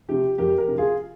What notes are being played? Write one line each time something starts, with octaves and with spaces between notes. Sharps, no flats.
C3 F3 G4
F2 G4 A#4
G4 A#4
C3 F3
F4 G#4